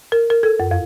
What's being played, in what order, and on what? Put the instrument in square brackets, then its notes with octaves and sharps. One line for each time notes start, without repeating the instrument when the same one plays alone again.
[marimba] A#4
A#4
A4
F#2
F2